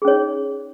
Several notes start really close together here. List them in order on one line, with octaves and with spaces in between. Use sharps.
G#4 C#4 C#5 D#4